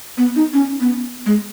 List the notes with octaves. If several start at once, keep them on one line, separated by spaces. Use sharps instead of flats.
B3
D#4
C#4
B3
G#3